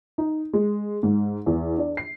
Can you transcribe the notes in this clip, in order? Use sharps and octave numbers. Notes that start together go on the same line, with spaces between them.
D#4
G#3
G#2
E2
D4
C7